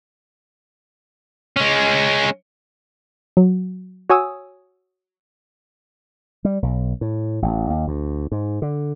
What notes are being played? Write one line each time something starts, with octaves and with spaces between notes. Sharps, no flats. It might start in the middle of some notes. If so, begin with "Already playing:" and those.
G#3 C#4
F#3
F#4 C#5 G#5 D#6 E6
G3
B1
A2
A1
D#2
D2
G#2
D3